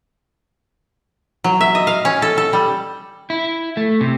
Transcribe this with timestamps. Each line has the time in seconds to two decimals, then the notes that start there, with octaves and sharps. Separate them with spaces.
1.44 F#3
1.61 E5
1.75 D#5
1.87 F5
2.05 C#4
2.22 A4
2.38 A4
2.53 G3
3.30 E4
3.77 A3
4.01 C3